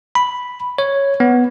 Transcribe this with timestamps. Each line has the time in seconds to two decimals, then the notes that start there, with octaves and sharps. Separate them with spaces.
0.15 B5
0.78 C#5
1.20 B3